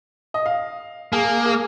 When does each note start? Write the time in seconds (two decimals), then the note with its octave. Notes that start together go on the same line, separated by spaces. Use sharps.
0.34 D#5
0.46 F5
1.13 A#3 G#4
1.46 G#4